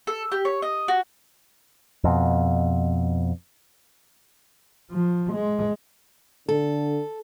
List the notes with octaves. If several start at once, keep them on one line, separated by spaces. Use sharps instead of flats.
A4
G4
C#5
D#5
F#4
F2 B2
F3
G#3
D3 A4